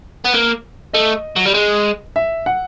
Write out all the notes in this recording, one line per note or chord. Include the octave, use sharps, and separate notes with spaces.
B3
A#3
A3 D#5
F#3
G3
G#3
E5
F#5